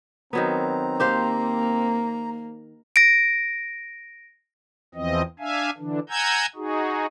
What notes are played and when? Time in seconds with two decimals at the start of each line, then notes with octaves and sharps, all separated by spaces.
0.33 D#3 F#3 B3 C4 A#5
1.00 A#3 G4 C5 F5
2.96 A#6 D7
4.95 E2 E3 F3 C4 D#5
5.39 D4 E5 F5 G#5
5.78 D3 E3 D4
6.09 F#5 G#5 A#5 E6 G6 G#6
6.55 D#4 F#4 G#4